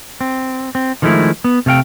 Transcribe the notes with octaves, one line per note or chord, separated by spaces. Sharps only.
C4
C4
D#3 F3 G#3 A3 E4
B3
C3 A3 F5 G5